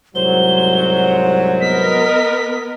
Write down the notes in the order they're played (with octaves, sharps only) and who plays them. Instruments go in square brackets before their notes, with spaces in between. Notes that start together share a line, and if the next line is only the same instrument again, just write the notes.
[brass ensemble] C2 G#2 F#3 [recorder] C5 [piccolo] G7
[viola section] B3 A#4 D#5 [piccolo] B6